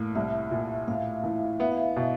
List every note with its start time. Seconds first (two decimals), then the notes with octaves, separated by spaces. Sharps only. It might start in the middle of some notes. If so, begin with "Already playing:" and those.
Already playing: A2 A#3
0.15 C2 E5
0.51 A#2
0.88 A2 F5
1.24 E3
1.60 B3 E5
1.71 F5
1.82 E5
1.96 B2